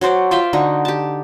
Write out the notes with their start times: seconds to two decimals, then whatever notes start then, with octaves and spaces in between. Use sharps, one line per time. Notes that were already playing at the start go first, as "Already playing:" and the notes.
0.01 F#3 F#4 C5 D5
0.31 F4 E5 F5 G5
0.53 D3 D#4 F#4 C#6
0.85 G4 A5